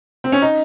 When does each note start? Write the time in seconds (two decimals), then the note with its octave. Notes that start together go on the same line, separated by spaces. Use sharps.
0.24 C4
0.32 C#4
0.42 D#4